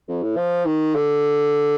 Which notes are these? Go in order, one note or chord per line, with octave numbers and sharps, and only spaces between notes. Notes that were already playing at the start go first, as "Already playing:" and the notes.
F2
A2
F3
D#3
D3